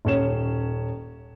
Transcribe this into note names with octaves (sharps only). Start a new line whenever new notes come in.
D#1 C#4 E7